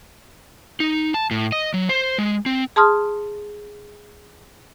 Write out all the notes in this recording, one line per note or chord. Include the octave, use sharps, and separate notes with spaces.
D#4
A5
A2
D#5
F#3
C5
G#3
C4
G#4 A5 C6 D#6 F6